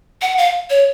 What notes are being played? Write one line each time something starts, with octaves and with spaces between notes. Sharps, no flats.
F#5
F5
C#5